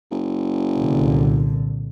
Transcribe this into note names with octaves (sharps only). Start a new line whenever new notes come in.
F#1
C2 A#2 D3